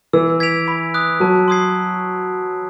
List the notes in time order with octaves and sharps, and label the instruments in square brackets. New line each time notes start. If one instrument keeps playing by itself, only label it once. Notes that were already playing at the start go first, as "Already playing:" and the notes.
[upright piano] E3 [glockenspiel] E6
[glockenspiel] G#6 B6 D7 F7
B5
D#6 F#6
[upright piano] F#3 [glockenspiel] A5
[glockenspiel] C6 D#6 G#6 C7